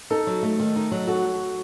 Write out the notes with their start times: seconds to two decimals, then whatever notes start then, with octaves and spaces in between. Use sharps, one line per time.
0.10 D#4 A4
0.27 F#3
0.43 A3
0.60 D#3
0.76 D#4
0.92 F#3
1.07 F#4 A4